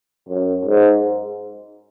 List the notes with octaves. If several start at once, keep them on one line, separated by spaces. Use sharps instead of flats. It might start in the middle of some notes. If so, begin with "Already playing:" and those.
F#2
G#2